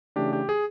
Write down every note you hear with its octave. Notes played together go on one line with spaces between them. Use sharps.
C#3 E3 A3 D4 G4
G4
G#4